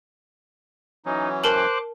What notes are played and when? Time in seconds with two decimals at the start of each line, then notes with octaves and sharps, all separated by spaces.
1.06 E3 F#3 C#4 D#4
1.44 A#4 C5 A5 D6 F#6 F#7